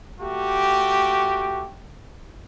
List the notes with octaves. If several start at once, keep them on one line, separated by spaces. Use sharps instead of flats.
A3 F#4 G4